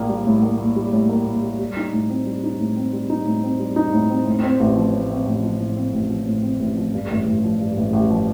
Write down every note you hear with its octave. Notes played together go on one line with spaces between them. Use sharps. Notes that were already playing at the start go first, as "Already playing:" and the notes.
Already playing: A#1 A2 A#3
G3
A2
A#3
A#1
G3
A2
A#3
A#1
G3
G3
D#4
A2
C4
G3
D#4
A2
C4
G3
D#4
A2
C4
G3
D#4
A2
C4
A2
C4
A1
F3
A2
C4
A1
F3
A2
C4
A1
F3
A2
C4
A1
F3
G2
A1
A1
F3
G2
A1
A1
F3